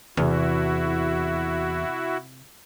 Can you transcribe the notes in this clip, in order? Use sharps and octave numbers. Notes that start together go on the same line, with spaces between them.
E2 C3 E4 F#4